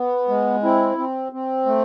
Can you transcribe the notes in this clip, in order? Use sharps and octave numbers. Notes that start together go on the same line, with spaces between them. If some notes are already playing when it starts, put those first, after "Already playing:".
Already playing: B3
G#3
C4 E4
C4
C4
A3